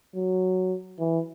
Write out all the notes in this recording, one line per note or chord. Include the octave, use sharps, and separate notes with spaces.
F#3
E3